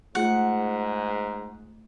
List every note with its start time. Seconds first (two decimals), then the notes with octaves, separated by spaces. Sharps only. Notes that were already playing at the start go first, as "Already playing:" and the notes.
0.15 G#2 A3 F4 G#4 F#5